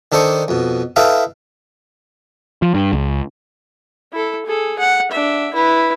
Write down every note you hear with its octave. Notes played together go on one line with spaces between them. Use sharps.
D#3 D4 A4 C5 D#5 C#6
F2 B2
E4 A4 B4 D#5 F5 G5
F3
G2
C#2
E4 A4
G#4 A4
F#5
D4 E5
E4 B4